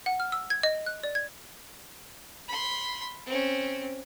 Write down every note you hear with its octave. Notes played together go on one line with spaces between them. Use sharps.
F#5
F6
E6
G#6
D#5
F#6
D5
G#6
B5 C6
C4 C#4